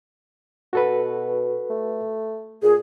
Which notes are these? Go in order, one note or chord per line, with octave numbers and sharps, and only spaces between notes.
B2 F#4 A4 B4
A3
A#2 G#4